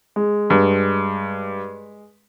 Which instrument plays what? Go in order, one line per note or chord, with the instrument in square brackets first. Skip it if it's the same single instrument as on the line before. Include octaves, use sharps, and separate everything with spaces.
[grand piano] G#3
[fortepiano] G2